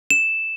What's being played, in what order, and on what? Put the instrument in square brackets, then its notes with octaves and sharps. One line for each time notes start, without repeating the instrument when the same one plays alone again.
[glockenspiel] E7